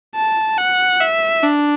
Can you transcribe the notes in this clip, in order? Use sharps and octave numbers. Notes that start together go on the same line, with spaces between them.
A5
F#5
E5
D4